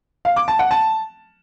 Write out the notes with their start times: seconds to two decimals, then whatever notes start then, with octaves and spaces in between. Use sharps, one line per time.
0.25 F5
0.36 D6
0.48 A5
0.59 F#5
0.71 A5